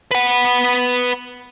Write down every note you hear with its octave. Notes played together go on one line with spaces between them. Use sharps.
B4 F#5